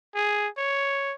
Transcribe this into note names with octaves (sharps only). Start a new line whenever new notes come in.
G#4
C#5